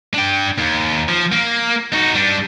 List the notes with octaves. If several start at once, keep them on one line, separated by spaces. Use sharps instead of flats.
D4 G5
D#2
F3
A#3
D#4 F#4
G3 D4